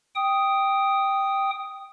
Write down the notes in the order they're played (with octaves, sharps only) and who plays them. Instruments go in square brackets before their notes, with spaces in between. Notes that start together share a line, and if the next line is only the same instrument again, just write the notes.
[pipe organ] G5 D#6